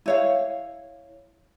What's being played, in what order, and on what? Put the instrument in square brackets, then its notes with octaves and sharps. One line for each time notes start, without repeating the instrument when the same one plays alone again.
[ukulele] E4 C#5 F5